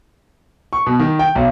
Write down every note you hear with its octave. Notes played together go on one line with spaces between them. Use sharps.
C#6
B2
D#3
G5
B1